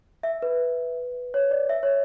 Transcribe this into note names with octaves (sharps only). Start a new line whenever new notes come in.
E5
B4
C#5
D5
E5
C#5